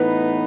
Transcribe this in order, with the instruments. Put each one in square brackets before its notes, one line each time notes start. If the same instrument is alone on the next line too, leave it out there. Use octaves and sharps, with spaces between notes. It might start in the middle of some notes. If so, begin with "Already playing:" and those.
Already playing: [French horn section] A2 E3 B3 D#4 [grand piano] B4